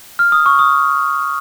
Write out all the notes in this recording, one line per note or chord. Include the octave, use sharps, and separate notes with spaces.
F6
D#6
C#6
D#6